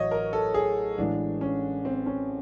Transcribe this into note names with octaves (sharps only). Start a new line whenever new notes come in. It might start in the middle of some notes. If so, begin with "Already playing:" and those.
Already playing: A1 F#3 C#5 D#5
A#4
A4
G#4
A1 A2 E3 G#3 D4
C#4
C4
C#4